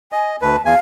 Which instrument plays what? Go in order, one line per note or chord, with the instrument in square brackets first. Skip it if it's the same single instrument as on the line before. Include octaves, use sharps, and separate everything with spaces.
[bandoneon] D#5 [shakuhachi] G#5
[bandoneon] D2 B4 [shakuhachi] A5
[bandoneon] E2 G#5 [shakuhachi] F5